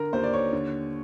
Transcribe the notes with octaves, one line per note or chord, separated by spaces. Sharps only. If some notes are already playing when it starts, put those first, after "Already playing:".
Already playing: D3 A#4
D#2 C5
D5
C#5
D3